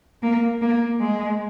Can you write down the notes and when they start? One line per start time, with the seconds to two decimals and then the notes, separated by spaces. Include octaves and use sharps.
0.23 A#3
0.62 A#3
1.00 G#3